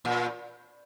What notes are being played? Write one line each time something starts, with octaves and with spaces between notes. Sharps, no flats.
A#2